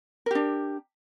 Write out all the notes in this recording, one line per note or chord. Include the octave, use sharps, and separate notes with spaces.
D4 G4 A#4